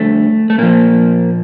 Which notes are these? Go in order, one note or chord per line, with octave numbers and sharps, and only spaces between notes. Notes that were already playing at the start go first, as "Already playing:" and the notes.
Already playing: F2 D3 G3 A3
A3
A#2 F3 A#3